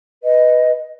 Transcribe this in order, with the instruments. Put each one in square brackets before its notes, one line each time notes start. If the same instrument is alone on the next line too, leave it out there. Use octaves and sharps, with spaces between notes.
[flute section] B4 D#5